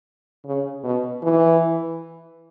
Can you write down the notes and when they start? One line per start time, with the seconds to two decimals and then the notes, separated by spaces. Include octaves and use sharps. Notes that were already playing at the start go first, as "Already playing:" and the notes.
0.45 C#3
0.84 B2
1.22 E3